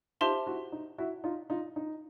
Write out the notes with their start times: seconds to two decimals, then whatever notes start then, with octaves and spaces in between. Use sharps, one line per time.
0.21 D#4 F4 G4 C5 E5 A5 C6
0.47 E4 F#4
0.72 D#4
0.98 E4 F#4
1.24 D#4 F4
1.50 D#4 F4
1.76 D#4